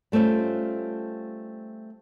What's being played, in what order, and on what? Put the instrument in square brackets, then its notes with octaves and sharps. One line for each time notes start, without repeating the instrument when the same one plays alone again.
[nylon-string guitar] G3 A3 C4 C#4 F4